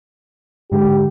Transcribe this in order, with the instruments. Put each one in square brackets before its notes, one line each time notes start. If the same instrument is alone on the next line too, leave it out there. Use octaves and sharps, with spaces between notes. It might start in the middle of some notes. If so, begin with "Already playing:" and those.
[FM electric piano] G#2 D3 G#3 [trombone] G4